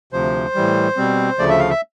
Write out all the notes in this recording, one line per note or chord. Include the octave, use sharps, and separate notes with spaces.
D2 C3 F3 C5
A2 E3 G3
B2 G3 C4
D2 C#3 F3 A3 D5
E5
F5
E5